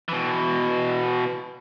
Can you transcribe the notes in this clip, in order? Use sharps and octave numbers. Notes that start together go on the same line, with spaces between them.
B2 E3